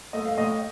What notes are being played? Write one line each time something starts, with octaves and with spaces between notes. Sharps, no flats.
A3 D#5
F5
A2 D#5